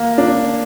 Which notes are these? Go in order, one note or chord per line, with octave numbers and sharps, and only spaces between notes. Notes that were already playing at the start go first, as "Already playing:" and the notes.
Already playing: A#3
D4